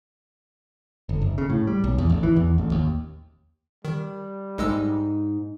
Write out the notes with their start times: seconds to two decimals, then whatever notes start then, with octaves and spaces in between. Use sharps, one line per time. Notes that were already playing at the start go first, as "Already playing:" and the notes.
1.09 G1
1.21 F#1
1.38 C#3
1.50 A2
1.67 G3
1.84 B1
1.98 E2
2.10 A1
2.23 E3
2.36 E2
2.58 A1
2.72 D#2
3.85 D#3 G3
4.58 B1 G#2 G#3 D#4 E6